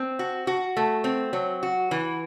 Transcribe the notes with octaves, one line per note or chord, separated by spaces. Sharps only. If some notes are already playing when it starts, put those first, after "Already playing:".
Already playing: C4
F#4
F#4
A3
C4
F#3
F#4
E3